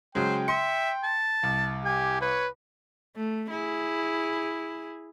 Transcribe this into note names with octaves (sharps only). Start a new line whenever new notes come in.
C#3 F#3 G#3 C5 G5
E5 C6 C#7
A5
C2
G4 G#5
B4 C#5
A3
E4 G#4